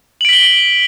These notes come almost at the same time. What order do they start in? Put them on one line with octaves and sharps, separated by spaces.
F#7 D7 B6 G7